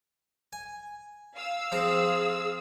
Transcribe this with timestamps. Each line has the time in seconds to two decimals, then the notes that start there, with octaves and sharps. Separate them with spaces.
0.53 G#5
1.36 F5 E6
1.72 F3 C4 G#4 A#5